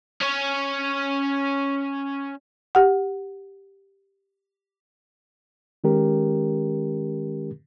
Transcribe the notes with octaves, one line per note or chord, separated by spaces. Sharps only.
C#4 C#5
G4 F#5
D#3 G#3 C#4 G4 A#4